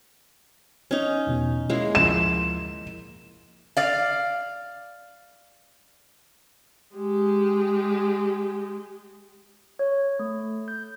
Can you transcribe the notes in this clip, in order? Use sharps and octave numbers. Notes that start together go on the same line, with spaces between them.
C#4 D#4
E2 B2 E3
G#3 A#3 C#4 E4
D2 F3 C6 E7
D5 F5
G#3 G4
C#5
A3
G6